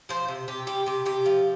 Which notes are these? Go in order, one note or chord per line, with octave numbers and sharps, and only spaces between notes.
F3 C5
C3
C3 G4
G3 G4
C3 G4
C3 G4
F3